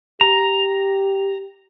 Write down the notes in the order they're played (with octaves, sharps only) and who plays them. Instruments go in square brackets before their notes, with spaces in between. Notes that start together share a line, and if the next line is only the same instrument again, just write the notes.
[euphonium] G4 [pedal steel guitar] A#5